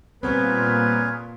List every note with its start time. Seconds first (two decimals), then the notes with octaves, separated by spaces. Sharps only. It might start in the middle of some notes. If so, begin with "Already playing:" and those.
0.23 A#2 G3 B3 C4 G#4 A#4 B4 C#5